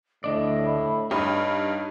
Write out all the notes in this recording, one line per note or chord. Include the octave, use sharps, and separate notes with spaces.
D2 A2 D4 D5 D#5
B5
G2 D#4 G4 C#5 D#5